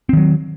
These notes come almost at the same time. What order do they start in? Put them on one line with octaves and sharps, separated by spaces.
C4 D#3 F#3